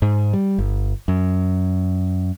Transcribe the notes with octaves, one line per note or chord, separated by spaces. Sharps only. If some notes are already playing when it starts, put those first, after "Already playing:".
G#2
G3
G1
F#2